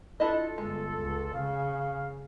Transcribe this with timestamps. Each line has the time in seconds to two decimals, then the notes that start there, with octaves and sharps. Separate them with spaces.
0.20 D4 E4 F4 A4 D#5
0.58 G1 G#3
1.00 C#2
1.34 C#3 F5